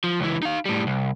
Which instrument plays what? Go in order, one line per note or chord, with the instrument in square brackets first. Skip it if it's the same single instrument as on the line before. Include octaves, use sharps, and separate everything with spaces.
[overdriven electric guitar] F3
C#2 E3
D#4 F5
A2 G3
C2